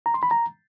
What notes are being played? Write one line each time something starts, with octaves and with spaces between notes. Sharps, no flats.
A#5
C6
B5
A#5